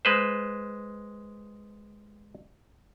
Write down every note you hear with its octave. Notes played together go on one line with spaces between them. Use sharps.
G#3 B4 C5